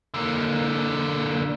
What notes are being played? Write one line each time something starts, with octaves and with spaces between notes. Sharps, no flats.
D3 A#3